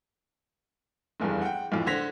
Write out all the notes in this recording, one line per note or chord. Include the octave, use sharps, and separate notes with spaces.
F1 E2 G2 C#3
F#5 G5
B1 F2 A2
D3 C5 G#6 A#6 B6 F7